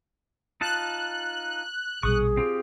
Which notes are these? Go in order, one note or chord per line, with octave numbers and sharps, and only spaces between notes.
D#4 F4 A5 F#6
A#1 B2 G3 G#4 C#6 D#6
C4 F4 G4